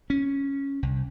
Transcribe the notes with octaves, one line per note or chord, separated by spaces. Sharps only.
C#4
C2